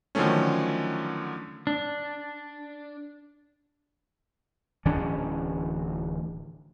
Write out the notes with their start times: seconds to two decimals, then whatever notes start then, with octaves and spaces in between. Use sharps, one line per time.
0.15 D3 D#3 F3 F#3 A3 C#4
1.67 D4
4.85 D1 E3 C#4 D4